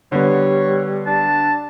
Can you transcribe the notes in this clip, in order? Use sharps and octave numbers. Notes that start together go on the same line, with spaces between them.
D3 G3 B3 C#5
D4 A5